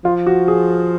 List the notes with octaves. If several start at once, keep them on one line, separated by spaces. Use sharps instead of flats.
F3 F4
F#4
G#4